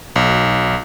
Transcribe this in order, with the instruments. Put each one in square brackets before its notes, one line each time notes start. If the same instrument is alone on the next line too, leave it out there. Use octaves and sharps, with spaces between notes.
[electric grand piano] B1